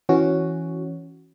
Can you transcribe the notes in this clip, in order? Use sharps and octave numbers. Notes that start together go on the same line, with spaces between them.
E3 C#4 F#4